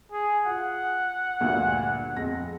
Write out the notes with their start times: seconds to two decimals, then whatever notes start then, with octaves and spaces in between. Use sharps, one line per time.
0.12 G#4
0.46 F4 F#5
1.40 D2 G2 A#2
2.16 F2 G#3 A#6